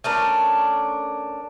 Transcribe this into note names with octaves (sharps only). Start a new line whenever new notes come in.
A3 C#4 D4 A#4